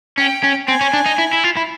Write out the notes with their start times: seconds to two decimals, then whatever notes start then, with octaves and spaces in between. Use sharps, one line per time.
0.17 C#4 G5
0.43 C#4
0.68 C4 G#5
0.81 C#4
0.93 D4
1.06 D#4
1.19 E4
1.33 E4
1.44 F4
1.57 E4